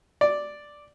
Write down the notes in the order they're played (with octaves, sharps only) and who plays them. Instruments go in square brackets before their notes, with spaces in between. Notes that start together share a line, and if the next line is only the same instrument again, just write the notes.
[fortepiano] D5